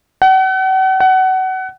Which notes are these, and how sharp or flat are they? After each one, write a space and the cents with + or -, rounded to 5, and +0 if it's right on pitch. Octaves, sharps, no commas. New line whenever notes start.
F#5 +40
F#5 +25